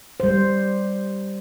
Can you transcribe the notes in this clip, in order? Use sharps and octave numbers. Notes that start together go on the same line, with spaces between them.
G3 C5